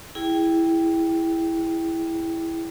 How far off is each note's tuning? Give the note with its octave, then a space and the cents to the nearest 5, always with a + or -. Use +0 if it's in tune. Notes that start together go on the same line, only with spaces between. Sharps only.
E4 +0 G#4 -15 G5 +0